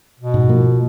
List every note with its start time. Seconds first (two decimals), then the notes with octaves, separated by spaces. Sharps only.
0.20 B2
0.34 G#2
0.49 F3 A#3